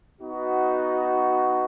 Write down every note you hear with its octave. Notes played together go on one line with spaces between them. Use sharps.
B3 D#4 F#4